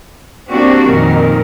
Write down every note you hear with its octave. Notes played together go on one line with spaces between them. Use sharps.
A#3 C4 D4 F#4 G4
F2 A#2 D#3 A#4